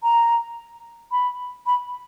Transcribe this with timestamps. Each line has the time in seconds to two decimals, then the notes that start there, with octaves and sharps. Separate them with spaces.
0.03 A#5
1.12 B5
1.66 B5